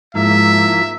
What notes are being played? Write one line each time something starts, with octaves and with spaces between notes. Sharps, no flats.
G#2 F3 A#3 E4 E5